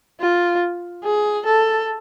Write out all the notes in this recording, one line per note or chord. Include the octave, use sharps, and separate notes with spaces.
F4
G#4
A4